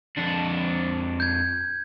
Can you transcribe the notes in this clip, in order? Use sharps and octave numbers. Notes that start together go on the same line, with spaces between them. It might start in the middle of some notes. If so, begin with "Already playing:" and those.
F2 D4
G6 G#6